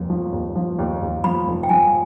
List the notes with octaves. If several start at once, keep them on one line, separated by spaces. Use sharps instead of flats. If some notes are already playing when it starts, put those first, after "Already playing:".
Already playing: F1 D#2
F3
D#2
F3
D#2
D#2
F3 B5
F1
G5
F3 G#5